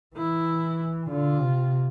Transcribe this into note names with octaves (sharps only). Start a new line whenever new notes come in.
E3 E4
D3 F4
C3